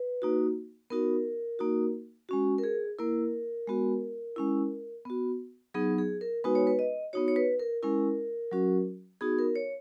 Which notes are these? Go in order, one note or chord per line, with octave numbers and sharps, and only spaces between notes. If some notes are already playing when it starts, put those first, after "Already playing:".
Already playing: B4
A#3 D#4 F#4
B3 D#4 F#4 A#4
A#3 D#4 F#4
G#3 C#4 F#4
A#4
G#4
A#3 E4 A#4
G#3 B3 F#4
G#3 C#4 E4
B3 F#4
F#3 B3 D#4 G#4
G#4
A#4
G#3 B3 D#4 F#4 B4
C#5
B4
D#5
B3 D#4 F#4 C#5
C#5
B4
A#4
G#3 C#4 E4 A#4
F#3 C#4 F#4
B3 D#4 F#4 G#4
A#4
C#5